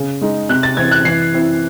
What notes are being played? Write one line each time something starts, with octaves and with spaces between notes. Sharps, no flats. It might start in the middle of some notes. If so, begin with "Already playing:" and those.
Already playing: C#3
G#3 D#4
C3 F#6
A6
E3 C4 G#6
F#6
E3 C7
C4 E4